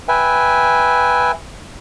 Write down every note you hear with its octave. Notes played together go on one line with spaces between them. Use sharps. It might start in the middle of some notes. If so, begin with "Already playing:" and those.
B4 E5 G5 G#5